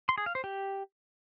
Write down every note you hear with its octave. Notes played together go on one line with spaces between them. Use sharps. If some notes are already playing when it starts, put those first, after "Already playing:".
C6
G#4
F5
C5
G4